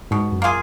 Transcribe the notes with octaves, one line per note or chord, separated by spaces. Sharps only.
G#2 B2
F#2
A#3 F4 G#4